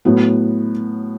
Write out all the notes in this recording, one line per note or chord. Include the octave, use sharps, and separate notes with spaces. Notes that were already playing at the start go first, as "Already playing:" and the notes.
A2 F#3 B3